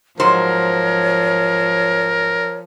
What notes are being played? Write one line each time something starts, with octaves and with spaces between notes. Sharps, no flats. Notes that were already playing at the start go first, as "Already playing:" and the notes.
G#2 F3 F#3 A#4 C5 C#5